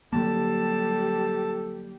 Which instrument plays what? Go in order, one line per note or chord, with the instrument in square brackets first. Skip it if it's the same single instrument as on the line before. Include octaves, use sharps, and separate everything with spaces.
[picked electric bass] D3 F#3 A#3 [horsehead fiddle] G3 G4 [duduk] A4 [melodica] A5